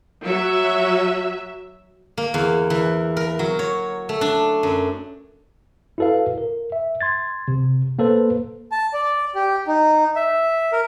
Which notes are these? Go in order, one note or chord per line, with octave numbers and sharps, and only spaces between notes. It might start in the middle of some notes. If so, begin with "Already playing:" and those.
F#3 E5
A#3
E2
E3
A#4
F#3
C#5
A3
D4
F#2
E4 F#4 A4 B4 F5
A#4
E5
C6 G#6 A6
C3
A#3 A4 B4 C5
A5
D5
G4
D#4
E5
A#4